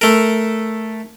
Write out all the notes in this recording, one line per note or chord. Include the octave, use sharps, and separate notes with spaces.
A3 A#4